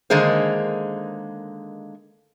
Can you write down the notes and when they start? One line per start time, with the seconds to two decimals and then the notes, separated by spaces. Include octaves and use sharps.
0.10 D3 D#3 G#3 A#3 G#4 C5